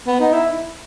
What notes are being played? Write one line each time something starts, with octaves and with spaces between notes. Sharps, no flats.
B3
D#4
E4